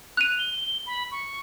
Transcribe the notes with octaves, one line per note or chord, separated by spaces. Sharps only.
F#6 D#7 F7
G7
B5
C#6